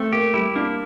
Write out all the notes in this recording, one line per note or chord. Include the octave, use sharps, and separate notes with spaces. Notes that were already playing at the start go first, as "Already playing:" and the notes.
Already playing: A3 C4
A#3 G4
G3 E4
A#3 D4